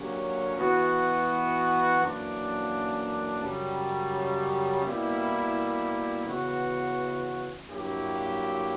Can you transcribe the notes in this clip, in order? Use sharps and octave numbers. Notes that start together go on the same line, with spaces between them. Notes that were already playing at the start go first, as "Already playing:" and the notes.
Already playing: D3 F#3 A#3 C#4 G4
E3 B3 F#4
F#2 E3 A#3 D4
F#2 C#3 G3
B2 G3 A#3 E4
C#3 E3 B3 F#4
G2 F#3 A#3 E4 G4